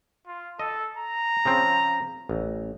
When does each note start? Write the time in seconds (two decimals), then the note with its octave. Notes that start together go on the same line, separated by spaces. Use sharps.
0.27 F4
0.60 A4 D#5
0.97 A#5
1.45 C#3 F3 C4
2.29 A1